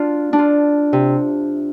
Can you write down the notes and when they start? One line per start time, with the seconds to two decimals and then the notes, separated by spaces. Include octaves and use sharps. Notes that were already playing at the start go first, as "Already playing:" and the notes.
Already playing: D4 F4
0.33 D4
0.39 F4
0.93 C3